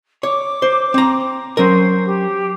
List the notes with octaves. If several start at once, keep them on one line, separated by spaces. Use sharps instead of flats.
C#5 D6
C5
C4 A#5
F#3 C#4 A#4 C5
G4